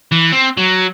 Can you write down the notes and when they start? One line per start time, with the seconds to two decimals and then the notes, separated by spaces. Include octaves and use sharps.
0.12 E3
0.32 C4
0.57 F#3